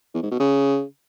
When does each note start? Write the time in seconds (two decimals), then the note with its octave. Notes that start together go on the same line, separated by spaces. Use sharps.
0.14 E2
0.23 G#2
0.31 B2
0.40 C#3